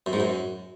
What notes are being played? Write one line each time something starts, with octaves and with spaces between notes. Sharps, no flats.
F#2
G#2
F#2